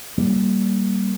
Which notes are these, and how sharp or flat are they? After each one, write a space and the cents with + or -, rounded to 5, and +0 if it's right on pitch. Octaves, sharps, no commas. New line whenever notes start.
G3 -15 A#3 +0